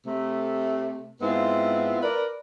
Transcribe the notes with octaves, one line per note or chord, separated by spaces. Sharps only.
C3 A3
G#2 B3 C4 E4 F4
A#4 B4 D5